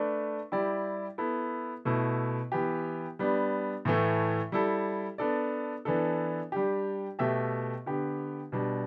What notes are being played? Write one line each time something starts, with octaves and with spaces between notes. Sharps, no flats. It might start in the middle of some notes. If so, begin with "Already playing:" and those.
Already playing: A3 D4 B4 D5
G3 E4 G4 D5
B3 E4 A4
B2 A3 E4
E3 B3 G4
G3 B3 D4
A2 E3 A3
G3 E4 A4
B3 D4 A4 D5
E3 B3 D4 A4
G3 D4 G4
B2 A3 G4 E5
D3 B3 G4
B2 G3 D4